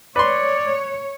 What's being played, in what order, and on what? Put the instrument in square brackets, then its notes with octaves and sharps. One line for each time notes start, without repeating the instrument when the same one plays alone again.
[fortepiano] B4 C6 [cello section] C#5 [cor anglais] D5